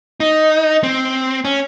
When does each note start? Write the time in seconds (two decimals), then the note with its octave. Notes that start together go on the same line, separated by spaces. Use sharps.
0.20 D#4
0.83 C4
1.45 C#4